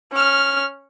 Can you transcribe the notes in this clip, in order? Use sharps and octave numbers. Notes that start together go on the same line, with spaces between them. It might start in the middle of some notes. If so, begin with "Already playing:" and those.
C#4 F6